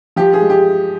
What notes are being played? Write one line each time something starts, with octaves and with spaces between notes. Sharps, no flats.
F3 G4
G#4
G#3
G4